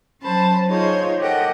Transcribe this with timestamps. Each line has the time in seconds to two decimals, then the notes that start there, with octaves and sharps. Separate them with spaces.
0.21 F#3 C#4 C5 A5 B5
0.68 D#4 F4 G#4 C5 C#5
1.19 G4 A4 A#4 D#5 F#5 G5